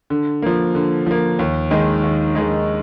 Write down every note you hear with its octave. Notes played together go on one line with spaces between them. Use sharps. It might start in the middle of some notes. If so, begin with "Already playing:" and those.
D3
F3 A#3
D3
F3 A#3
D#2
D#3 G#3 D#4
D#2
D#3 G#3 D#4